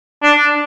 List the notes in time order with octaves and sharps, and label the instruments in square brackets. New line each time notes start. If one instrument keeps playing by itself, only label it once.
[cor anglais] D4